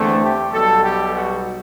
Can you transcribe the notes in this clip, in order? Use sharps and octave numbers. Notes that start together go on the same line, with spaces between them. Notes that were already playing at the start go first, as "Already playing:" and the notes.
Already playing: E2 D3 A3 C4
G4
B1 B2 G3 A4
G4
F#4